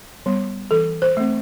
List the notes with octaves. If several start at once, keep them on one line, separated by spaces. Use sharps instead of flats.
G3 B3
E3 A4
C5
A3 C4